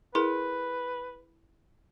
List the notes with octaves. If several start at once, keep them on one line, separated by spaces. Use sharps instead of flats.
E4 G#4 A#4 B4